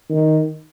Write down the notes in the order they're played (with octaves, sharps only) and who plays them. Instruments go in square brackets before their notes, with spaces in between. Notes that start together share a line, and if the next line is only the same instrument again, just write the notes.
[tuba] D#3